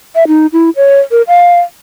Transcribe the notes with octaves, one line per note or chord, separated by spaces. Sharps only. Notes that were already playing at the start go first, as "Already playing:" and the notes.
E5
D#4
E4
C#5
A#4
F5